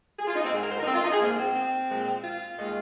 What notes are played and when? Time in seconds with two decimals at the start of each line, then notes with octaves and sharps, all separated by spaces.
0.18 G#4
0.26 F4
0.34 D#4
0.43 C4
0.51 G#2 D#3 G#3 G#4
0.60 A#4
0.69 C5
0.77 A#4
0.81 D#4
0.85 C4
0.94 F4
1.03 D#4
1.11 G#4
1.19 G#2 F3 G#3 A#3
1.36 C4
1.53 C4
1.88 A#2 F3 G#3
2.21 F4
2.55 D#2 D#3 G#3